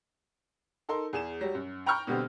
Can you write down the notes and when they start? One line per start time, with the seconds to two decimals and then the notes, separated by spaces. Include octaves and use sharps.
0.89 D#4 A4 A#4 C6
1.13 E2 G#4 E7
1.41 F#3 G3
1.55 F#2
1.86 G5 A#5 B5 C#6 F6 G6
2.07 B2 D3 G3 B3 C4